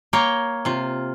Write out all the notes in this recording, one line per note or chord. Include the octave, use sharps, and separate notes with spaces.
A#3 A#4 C#5 G5 A#5
C3 F4